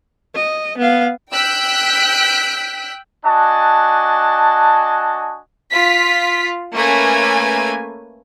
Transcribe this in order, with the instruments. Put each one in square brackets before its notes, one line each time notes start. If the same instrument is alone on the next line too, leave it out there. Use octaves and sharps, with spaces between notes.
[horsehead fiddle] D#5
B3 F5
[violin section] G5 E6 F#6 G6 B6 D7
[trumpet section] D4 F#4 D#5 G#5 A5
[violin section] F4 B6
A3 A#3 C#4 B4 G#5